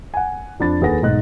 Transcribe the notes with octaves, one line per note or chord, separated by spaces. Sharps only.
F#5 G#5
F2 D4 B5 A6
D#2 G#4 A4 B4 F#5 A#6
B1 G#2 D#5 F#6